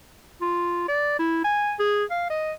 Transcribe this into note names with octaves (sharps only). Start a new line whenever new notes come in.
F4
D5
E4
G#5
G#4
F5
D#5